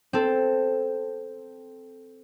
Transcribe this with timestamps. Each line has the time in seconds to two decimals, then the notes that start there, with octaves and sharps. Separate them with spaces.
0.13 C4 A4